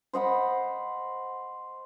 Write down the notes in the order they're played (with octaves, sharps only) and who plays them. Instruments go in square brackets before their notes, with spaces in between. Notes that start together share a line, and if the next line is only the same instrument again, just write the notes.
[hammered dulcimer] C5 D#5 F#5 B5